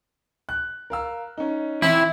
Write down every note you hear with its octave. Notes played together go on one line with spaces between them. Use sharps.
F#6
A#4 F5 E6
C#4 D#4
E3 C4 E4 C6